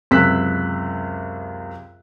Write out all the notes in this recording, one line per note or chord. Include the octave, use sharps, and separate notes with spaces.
C#2 F#2 C3 E6 F#6 B6